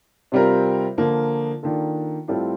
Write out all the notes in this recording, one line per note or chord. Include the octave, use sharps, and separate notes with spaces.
C3 G3 C4 F4 A#4
D3 F3 A#3
D#3 A#3 D4 F4 A4
A2 G3 C4 F4 A4